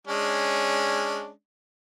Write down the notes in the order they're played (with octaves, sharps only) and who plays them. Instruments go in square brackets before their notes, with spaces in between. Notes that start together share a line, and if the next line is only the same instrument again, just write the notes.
[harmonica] G#3 C#4 D4